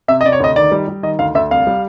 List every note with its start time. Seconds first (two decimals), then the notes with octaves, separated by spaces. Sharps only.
0.08 C3 E5
0.21 D#5
0.24 C3 D5
0.32 C#5
0.40 D2 D#5
0.56 D#3 D5
0.72 G3
0.88 G3
1.03 D#3 D#5
1.19 D2 F5
1.35 D2 E5
1.51 C2 F5
1.67 G3